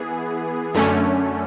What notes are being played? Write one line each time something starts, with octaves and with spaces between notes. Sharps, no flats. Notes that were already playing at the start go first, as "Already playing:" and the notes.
Already playing: E3 B3 G#4
F#2 D3 A3 C#4